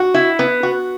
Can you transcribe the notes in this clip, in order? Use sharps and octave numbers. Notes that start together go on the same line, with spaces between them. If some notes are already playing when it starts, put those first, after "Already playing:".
Already playing: F#4
E4
B3
F#4